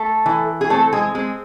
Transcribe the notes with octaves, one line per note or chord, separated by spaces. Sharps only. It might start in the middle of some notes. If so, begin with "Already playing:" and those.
Already playing: A3 A4
E3
G#4
A3 C4 A4
G#3 G#4
G#3 C4 G#4